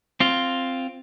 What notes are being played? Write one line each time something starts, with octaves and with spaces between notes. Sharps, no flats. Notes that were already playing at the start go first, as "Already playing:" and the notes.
C4 F4